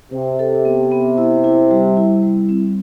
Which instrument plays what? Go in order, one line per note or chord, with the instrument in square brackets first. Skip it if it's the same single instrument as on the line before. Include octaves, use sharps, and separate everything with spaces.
[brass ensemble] C3 [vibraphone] C5
[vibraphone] A4
B3
B3
E4
E4
G3
E4
G3
C4